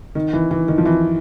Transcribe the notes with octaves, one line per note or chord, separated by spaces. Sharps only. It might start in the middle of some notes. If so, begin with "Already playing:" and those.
D#3
E3
E3
D#3
F3
E3